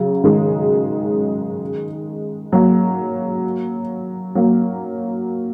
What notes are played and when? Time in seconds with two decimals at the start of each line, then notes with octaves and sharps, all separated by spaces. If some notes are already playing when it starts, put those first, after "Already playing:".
Already playing: C#3 F#3
0.24 D#3 G#3
2.52 F#3 A#3
4.35 F#3 A#3